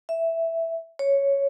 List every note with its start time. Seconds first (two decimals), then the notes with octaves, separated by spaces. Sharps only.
0.09 E5
0.99 C#5